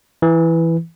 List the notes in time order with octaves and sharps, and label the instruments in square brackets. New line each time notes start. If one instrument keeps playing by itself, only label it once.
[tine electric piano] E3